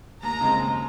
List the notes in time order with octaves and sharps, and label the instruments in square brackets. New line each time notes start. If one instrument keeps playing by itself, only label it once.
[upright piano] D#2 [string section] A#5
[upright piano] C#3 G#3 C4 D#4
D#2